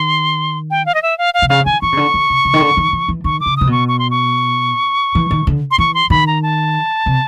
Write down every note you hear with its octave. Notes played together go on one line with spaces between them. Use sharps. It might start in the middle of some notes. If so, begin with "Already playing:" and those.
Already playing: D#3 C6
G5
F5
D#5
E5
F5
F5
C3
C#3 F5
D#3 G#5
E3 C#6
C#3
D3
D3
C3
C#3
D#3
D3
D#3
E3
E3
D#3 C#6
D6
C#3
C3 D#6
B2 C#6
C#6
C6
C#6
E3
D#3
D3
C6
E3 C#6
C6
D#3 B5
A#5
A5
C3